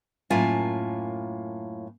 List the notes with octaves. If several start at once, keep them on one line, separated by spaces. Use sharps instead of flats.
F#2 A2 A#3 F4 G#5 A5